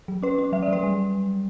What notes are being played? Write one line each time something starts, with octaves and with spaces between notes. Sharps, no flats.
F#3
C#4 B4
C#4
F#3 E5
D5
F#3 B4
G3